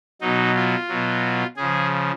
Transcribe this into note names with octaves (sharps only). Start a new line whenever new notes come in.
B2 F#3 D#4
F4
B2 F#3
C#3 F3 G#4